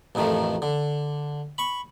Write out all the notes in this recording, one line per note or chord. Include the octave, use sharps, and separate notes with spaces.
A1 F2 D#3 F3 A3
D3
B5 C#6